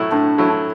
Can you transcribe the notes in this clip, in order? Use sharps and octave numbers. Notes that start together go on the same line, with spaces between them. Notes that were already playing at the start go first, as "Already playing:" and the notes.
Already playing: A2 F#3 A3 E4
A2 D4
F#3 A3 E4